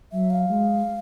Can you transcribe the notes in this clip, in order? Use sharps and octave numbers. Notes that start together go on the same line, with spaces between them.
F#3 E5
F5
G#3